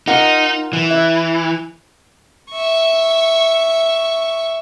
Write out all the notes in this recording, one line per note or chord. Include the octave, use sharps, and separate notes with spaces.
D#4 F4 A#4 F#5
E3
E5
E5 C#6